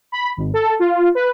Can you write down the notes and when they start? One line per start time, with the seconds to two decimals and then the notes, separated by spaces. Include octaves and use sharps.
0.12 B5
0.37 G#1
0.54 A4
0.80 F4
1.15 B4